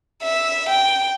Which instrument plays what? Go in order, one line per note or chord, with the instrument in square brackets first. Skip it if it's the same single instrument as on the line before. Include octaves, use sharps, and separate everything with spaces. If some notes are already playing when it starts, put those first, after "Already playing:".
[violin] E5
G5